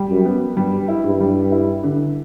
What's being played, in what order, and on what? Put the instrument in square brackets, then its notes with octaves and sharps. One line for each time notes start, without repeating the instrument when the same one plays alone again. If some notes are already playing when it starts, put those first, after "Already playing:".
Already playing: [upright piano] G3
[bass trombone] F#2
[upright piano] B3
[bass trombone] G2 [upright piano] G3
[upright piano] E4
[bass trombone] G2
[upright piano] G3
E4
D3